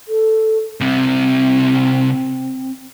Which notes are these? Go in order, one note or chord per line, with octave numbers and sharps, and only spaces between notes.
A4
C2 C3 C4